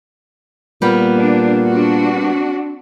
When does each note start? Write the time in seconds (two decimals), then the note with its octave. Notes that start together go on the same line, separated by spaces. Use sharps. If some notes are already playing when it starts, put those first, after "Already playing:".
0.82 A#2 G3 A#3 B3
1.15 D4
1.68 C4 D4 F#4